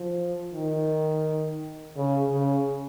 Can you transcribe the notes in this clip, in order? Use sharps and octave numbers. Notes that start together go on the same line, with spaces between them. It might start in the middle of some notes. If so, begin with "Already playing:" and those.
Already playing: F3
D#3
C#3
C#3